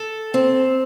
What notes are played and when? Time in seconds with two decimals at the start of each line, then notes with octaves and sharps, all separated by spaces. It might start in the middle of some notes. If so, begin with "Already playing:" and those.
Already playing: A4
0.34 C4